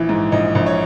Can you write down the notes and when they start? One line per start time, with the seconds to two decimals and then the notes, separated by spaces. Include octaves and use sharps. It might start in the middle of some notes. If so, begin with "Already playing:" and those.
Already playing: A#1 E3
0.09 G#2
0.32 A#1 D#5
0.55 A#1
0.66 C#5